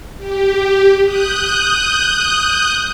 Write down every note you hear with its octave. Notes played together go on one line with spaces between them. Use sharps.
G4
D#6 F#6 G6